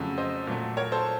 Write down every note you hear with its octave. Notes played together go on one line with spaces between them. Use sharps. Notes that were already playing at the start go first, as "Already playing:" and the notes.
Already playing: F2 C#3 F#3 A3
C5 D#5
A#2 F#3 A3
A#4 C#5
A4 C5